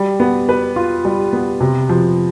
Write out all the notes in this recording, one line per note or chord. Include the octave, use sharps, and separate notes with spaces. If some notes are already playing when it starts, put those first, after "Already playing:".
Already playing: G3
B3
B4
F4
G3
B3
C3
F3